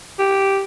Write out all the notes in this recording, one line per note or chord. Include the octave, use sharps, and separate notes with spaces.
G4